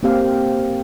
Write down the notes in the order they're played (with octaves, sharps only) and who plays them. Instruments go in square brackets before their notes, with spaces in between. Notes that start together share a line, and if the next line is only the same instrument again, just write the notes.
[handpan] A#3 C4 G4 F5